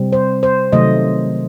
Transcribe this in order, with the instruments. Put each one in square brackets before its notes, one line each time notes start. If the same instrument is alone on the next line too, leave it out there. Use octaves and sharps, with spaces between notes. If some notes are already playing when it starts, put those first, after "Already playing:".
Already playing: [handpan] C3 G3 C4
C5
C5
C3 D#3 F#3 A3 D#5